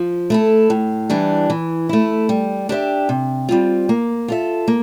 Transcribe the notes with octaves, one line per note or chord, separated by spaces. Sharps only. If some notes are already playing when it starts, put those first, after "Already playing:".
Already playing: F3
A3 E4 A4
A2
E3 G3 D4
E3
A3 E4
G3
D4 G4 C5 E5
C3
G3 C4 F4
A#3
F4 A4 E5
A#3